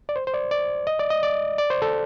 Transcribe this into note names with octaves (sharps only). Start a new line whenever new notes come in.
D5
C5
C5
D5
D5
D#5
D5
D#5
D5
D5
C5
A4